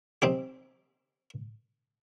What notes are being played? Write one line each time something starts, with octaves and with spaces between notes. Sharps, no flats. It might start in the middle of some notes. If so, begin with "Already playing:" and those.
C4 D#4 G4